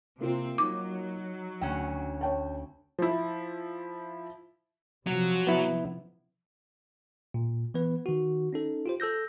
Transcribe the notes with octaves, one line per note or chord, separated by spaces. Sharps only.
C3 A#3 C4 F4
F#3 D#4 D6
D2 C#4 F#5 G5
C#5 G5 A5
F3 E4
C3 F3 F#3
B3 E4
A#2
E3 B3 B4
D#3 F#4
C#4 D#4 A4
F4 G4 C5
A4 E6 G6 A#6